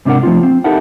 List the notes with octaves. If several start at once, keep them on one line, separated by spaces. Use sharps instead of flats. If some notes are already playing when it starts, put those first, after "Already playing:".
G#2 C3 D4 F4 A#4 F#5
F3 A3 C4 F4
C4
D#4 E4 G4 A4 A#4 F#5